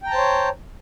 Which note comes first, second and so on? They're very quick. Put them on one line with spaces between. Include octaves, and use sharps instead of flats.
G5 A#5 A5 C5 C#5